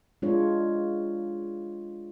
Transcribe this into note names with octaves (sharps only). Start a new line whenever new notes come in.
G#3 D4 F4 C#5